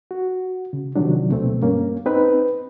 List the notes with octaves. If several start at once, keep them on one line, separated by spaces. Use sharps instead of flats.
F#4
C#3
C3 D#3 F3 F#3 D4
D2 B2 A3 C4
G2 A#3 C#4
C4 D#4 B4